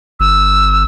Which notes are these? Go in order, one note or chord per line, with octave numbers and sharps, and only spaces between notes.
G1 E6